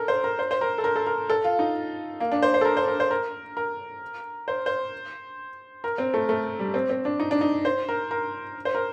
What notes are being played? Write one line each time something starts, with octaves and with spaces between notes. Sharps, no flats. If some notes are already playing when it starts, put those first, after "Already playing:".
Already playing: A4 A#4
C5
A#4
C5
C5
A#4
A4
A#4
A4
A#4
A4
F4
D#4
A#3
D4
C5
C5
A4
A#4
C5
A#4
C5
A#4
A#4
C5
C5
A#4
C4
A3
A3
G3
C4
C4
D4
D#4
D4
D#4
C5
A#4
A#4
C5
A#4